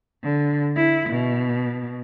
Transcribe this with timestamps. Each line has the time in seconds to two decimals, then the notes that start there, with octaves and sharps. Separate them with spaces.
0.23 D3
0.76 E4
1.09 B2